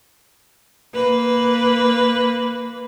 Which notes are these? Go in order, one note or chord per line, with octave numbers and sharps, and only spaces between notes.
A#3 B4